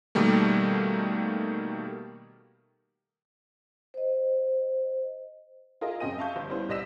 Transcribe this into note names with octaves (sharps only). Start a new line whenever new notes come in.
B2 D#3 G3 A3 A#3
C5 D#5
F4 G#4 A#4 D#5 E5
F#2 C#3 C4 D#5 G5 D#7
E5 F5 A5 C#6 G6
G1
G3 B3 C#4 E4 C5
C2 D5 D#5 E6 B6 E7